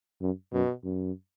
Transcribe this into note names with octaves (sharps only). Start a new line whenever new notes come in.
F#2
F#2 B2
F#2